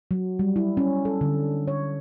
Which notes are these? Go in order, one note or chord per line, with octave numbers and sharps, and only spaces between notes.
F#3
G3
E4
C#4
A4
D3
C#5